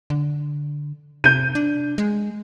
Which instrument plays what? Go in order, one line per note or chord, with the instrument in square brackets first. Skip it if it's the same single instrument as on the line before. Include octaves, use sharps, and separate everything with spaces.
[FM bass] D3
[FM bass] C3 [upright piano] G6 D#7
[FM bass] D4
G#3